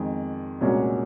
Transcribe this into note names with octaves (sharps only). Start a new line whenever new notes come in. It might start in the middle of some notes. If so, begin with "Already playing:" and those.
Already playing: F2 D#3 G#3
C2 A#2 G#3 C#4 F#4